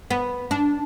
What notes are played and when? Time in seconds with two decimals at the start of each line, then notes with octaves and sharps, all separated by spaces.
0.10 B3
0.51 D4